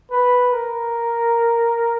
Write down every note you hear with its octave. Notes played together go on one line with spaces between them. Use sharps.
B4
A#4